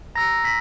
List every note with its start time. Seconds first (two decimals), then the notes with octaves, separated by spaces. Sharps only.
0.15 A#5 E6 A#6
0.45 B6